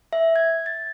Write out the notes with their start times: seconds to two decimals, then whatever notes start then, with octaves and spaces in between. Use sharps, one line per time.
0.13 E5
0.36 G#6
0.66 A6